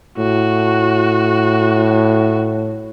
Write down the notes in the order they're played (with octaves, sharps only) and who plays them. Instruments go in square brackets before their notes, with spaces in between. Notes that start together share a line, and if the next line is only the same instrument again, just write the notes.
[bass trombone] A2 [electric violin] F#4